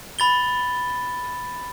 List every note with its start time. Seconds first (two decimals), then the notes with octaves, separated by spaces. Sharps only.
0.19 B5 A6 G7